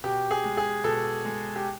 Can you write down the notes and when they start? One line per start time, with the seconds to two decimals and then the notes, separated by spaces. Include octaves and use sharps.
0.04 B2 G4
0.31 G#4
0.44 G#3
0.57 G#4
0.84 B2 A4
1.25 G#3
1.56 G4